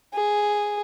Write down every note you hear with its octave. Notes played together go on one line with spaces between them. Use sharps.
G#4